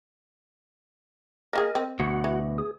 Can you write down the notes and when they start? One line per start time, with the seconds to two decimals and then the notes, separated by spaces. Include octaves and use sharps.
1.53 A#3 F4 G#4 A#4 D#5
1.75 C4
2.00 D2 B2 F#4 F#5
2.24 E3
2.58 G#4